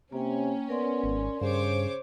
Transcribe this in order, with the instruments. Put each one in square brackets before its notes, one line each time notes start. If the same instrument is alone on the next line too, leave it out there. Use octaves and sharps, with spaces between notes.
[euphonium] C3 [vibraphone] A#3 G5 [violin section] C#4
[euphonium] B3 [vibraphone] A#4 D5 C6
[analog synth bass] G#1
[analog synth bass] G2 [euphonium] C#3 [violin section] C5 C#5 D6